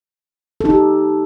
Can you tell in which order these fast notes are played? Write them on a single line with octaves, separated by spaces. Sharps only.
A4 D#4 G4